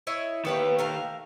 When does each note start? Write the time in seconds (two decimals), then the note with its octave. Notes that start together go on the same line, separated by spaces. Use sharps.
0.07 E4 C#5 D#5
0.45 D#3 B3 G4 B4 C#5
0.79 A3 A#4 F5